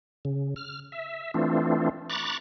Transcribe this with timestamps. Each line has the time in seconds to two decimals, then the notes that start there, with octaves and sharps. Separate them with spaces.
0.25 C#3
0.56 F6
0.92 E5
1.34 E3 A3 C4 D4 F4
2.09 A#5 B5 C#6 D6 F#6 A6